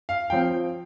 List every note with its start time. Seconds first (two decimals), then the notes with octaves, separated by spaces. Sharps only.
0.09 F5
0.30 F3 C4 G5